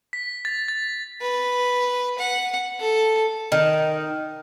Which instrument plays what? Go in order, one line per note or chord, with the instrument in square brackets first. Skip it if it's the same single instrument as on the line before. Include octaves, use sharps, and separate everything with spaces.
[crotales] B6
A6
A6
[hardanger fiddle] B4
F#5
A4
[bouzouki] D#3